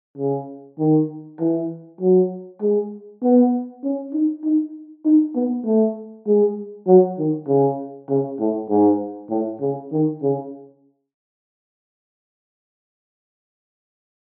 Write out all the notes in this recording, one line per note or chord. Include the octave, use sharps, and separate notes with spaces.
C#3
D#3
E3
F#3
G#3
B3
C#4
D#4
D#4
D#4
B3
A3
G#3
F#3
D#3
C#3
C#3
A2
G#2
A2
C#3
D#3
C#3